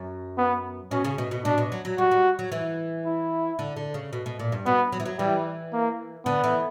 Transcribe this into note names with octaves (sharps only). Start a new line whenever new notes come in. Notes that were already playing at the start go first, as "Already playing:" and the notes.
Already playing: F#2
B3
B2 C#4
C#3
B2
B2
B2 D4
B2
F#3
F#3
G3 F#4
G3
F#3
E3
E4
D3
D3
C#3
B2
B2
A#2
G2
B2 B3
F#3
E3
F#3
E3 G3
A#3
D3 B3
E3